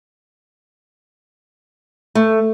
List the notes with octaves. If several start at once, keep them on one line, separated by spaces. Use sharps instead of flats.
A3